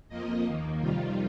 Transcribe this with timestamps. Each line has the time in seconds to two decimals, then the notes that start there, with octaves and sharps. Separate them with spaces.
0.09 F2 F3 A#3 D#5
0.45 D#2 D#3 A#3
0.79 F2 C3 D#3 G3 F4